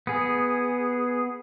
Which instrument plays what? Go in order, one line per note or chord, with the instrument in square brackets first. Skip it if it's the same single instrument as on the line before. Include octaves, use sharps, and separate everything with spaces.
[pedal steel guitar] B3 G#4